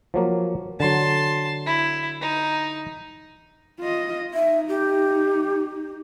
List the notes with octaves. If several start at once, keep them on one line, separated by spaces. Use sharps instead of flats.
F3 F#3 A#3
D3 F#3 A5 C6
E4
D#4
F4 D#5
D#4 E5
G4